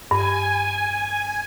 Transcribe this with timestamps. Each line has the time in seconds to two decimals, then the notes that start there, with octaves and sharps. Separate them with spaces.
0.11 G2 G#5